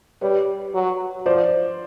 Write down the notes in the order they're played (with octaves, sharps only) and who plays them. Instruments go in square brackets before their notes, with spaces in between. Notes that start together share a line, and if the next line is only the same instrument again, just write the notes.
[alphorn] G3 [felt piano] B4 C#5
[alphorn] F#3
[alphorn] F3 [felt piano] C5 D5